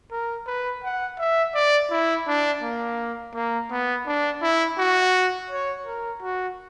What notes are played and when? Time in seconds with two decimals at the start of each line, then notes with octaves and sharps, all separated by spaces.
0.11 A#4
0.47 B4
0.84 F#5
1.19 E5
1.54 D5
1.90 E4
2.27 D4
2.62 A#3
3.34 A#3
3.70 B3
4.06 D4
4.42 E4
4.78 F#4
5.50 C#5
5.86 A#4
6.22 F#4